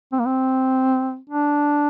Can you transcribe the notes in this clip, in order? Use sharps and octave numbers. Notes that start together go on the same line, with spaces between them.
C4
A#3
C4
D4